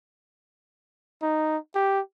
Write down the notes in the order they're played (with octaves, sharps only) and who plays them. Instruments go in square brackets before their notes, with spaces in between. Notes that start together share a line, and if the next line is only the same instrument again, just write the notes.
[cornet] D#4
G4